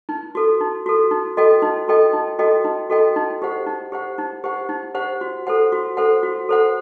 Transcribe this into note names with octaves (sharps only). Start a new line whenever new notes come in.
D#4
F#4 A4
D#4
F#4 A4
D#4
F#4 A4 D#5 G5
D#4
F#4 A4 D#5 G5
D#4
F#4 A4 D#5 G5
D#4
F#4 A4 D#5 G5
D#4
G4 C5 F#5
D#4
G4 C5 F#5
D#4
G4 C5 F#5
D#4
G4 C5 F#5
F#4
A4 C5 F#5
F#4
A4 C5 F#5
F#4
A4 C5 F#5